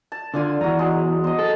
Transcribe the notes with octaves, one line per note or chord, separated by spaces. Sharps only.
A5
D3 D4 F4 G#5
E2 F#4 A#5
F#3 G#3
C5 D#5
A4